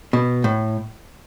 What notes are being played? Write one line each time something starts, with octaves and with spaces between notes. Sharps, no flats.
B2
A2